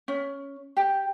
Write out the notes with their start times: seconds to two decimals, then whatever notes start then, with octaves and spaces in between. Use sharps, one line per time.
0.08 C#4
0.77 G4